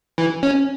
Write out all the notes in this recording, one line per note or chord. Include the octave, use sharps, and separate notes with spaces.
E3
C#4